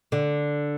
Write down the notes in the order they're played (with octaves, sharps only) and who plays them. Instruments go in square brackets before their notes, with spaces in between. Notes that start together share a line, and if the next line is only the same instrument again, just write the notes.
[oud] D3